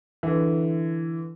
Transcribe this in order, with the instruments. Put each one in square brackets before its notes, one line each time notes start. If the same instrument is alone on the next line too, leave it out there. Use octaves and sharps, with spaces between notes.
[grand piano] D3 E3